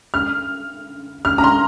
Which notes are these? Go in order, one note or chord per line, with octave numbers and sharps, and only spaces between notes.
F6
F6
A#5
C6